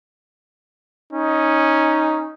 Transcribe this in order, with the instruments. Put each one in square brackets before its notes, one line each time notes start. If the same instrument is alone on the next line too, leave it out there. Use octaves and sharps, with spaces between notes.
[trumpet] C#4 [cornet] D#4